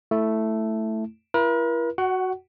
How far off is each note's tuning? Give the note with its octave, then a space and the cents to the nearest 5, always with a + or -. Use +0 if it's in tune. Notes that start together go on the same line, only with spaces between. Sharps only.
A3 +0 E4 +0
E4 +35 A#4 +45
F#4 +0 F#5 +25